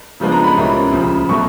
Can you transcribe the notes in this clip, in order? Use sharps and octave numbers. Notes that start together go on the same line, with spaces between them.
C#3 F3 G#3 B3 D4
A#5
B5
C2 A#2 G3 A#3 C#4
D2 C#3 F3
B2 F#3 A3 C#6